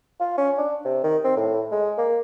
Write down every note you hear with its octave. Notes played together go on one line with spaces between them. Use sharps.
F4
C#4
D4
C3
D#3
C4
A2
G#3
A#3